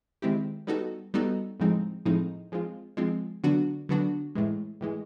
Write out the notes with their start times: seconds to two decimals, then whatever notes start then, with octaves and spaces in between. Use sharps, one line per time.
0.22 D#3 G#3 C4 E4 G4
0.67 G3 B3 D#4 F#4 A4
1.14 G3 B3 D#4 F#4 A4
1.60 A2 F3 G#3 C4 D#4
2.05 A2 F3 G#3 C4 D#4
2.52 F3 G#3 C4 F4
2.97 F3 G#3 C4 F4
3.44 D3 F#3 B3 D4 F#4
3.89 D3 F#3 B3 D4 F#4
4.35 A2 E3 G#3
4.81 A2 E3 G#3